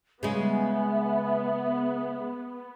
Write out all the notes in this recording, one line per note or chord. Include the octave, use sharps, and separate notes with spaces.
C#3 G#3 B3 E5